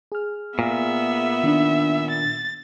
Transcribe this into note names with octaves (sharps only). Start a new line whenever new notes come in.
G#4 F6
A#2 B3 E5
D#3 D4
A6